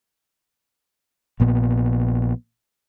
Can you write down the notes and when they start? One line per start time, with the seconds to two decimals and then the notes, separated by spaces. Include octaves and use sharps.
1.40 A#1 A#2 B3